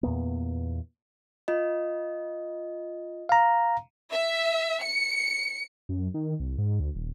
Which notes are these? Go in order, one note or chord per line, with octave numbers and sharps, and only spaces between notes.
E2 A#2 A#3 B3
F4 D#5
F5 A#5
E5
C#7
F#2
D#3
C2
G#2
D2
D#1